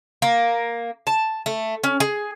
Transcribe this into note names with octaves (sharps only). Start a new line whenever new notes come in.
A#3
A5
A3
C#4
G#4